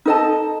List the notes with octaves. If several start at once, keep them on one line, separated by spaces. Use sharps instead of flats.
D#4 A4 D#5 A5